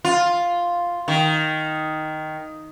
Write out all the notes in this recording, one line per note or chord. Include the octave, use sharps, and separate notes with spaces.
F4
D#3